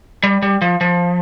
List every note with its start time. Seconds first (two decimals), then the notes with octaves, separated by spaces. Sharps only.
0.23 G3
0.42 G3
0.62 F3
0.81 F3